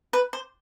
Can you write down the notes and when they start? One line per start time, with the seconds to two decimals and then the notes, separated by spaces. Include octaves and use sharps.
0.13 B4
0.33 C5